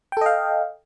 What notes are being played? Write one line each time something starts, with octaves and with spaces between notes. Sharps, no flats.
A4 D#5 F5 G5